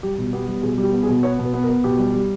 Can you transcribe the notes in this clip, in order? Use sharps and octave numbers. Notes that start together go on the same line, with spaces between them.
G3 G4
B2
B3 G4
G3
B2 G#4
G3
G4
B3
G#4
B2
B3 C#5
B2 B4
B3
A#4
B3
B2 G4
G3
G3